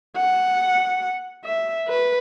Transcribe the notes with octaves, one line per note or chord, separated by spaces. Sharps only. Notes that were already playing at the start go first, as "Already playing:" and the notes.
F#5
E5
B4